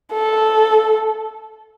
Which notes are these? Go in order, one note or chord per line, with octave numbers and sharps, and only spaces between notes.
A4